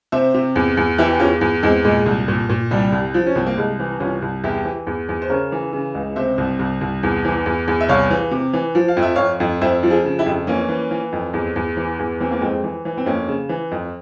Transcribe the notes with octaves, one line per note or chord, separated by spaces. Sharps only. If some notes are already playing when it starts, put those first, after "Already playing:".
C3 C5 E5
C3
E2
E2
E3 E4 G4
G4
E2 C#4 F4
E2
E2 G#3 C4
A#2 G#3
C2
A#2
A#2
C2 G3
C2
F3
C#4
C2 C4
A#3
C2 G#3
E3
C2 C#4 F4
C2
E2 E4 G4
E3
E2
E2
C5
C#3 A#4 C#5
E3
C#3
C#2
C3 C5 E5
C2
C2
C2
E2
E3
E2
E2
E5
C2 C#5 F5
E3
C3
E3
F3
F5
F2
E5
F2 C#5 F5
F2
F2 C5 E5
F3
F4 G#4
C#3
E4 G4
F2
E3 A#3 C#4
E3
E3
F2
E2
E2
E3
E2
E3 C4
A#3
F2 G#3 C4
E3
E3
C4
F2 A#3 C#4
C#3
E3
F2